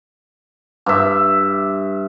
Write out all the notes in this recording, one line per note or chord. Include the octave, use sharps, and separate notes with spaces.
G2 E5